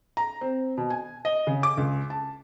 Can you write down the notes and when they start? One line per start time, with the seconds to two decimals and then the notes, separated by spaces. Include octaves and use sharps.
0.17 A#5
0.41 C4
0.78 B2
0.90 G#5
1.25 D#5
1.47 C#3
1.63 D6
1.77 C#2
2.10 A5